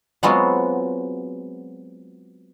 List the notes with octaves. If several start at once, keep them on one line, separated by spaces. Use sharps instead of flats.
F#3 G#3 B3 C4 F4 F#4